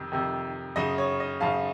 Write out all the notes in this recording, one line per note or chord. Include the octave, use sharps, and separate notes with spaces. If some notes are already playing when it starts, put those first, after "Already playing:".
Already playing: F2 C3 D#3
F2 C3 D#3
F#2 C#3 D#5
C#5
D#5
F#2 C#3 F5 A5